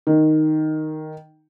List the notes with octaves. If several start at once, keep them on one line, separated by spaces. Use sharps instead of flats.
D#3